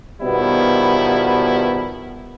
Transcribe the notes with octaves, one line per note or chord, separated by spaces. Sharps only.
B2 D#3 F3 G3 B3 E4